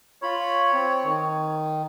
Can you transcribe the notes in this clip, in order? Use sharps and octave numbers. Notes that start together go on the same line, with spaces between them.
F4 C#5 B5
C4
D#3